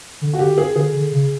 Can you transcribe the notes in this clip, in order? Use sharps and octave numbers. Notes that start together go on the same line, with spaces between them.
D3
F#4
D3 G4
G#4
D3 G#4
D3
C#3